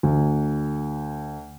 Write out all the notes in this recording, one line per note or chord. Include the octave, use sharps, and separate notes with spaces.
D2